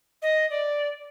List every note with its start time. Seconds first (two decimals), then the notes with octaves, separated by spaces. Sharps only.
0.22 D#5
0.50 D5